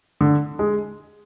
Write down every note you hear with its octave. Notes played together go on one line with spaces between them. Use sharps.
D3
G#3